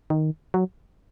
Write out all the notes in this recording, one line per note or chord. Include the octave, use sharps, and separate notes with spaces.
D#3
F#3